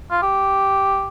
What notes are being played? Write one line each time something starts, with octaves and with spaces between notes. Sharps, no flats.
F4
G4